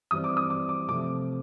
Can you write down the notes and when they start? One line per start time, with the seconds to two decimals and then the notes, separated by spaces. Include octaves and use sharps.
0.11 E3 G3 C4 D#6
0.24 D6
0.37 D#6
0.50 D6
0.69 D6
0.89 C3 F3 A3 C4 D6